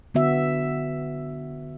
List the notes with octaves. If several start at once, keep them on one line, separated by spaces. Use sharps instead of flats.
D3 B3 F#4 E5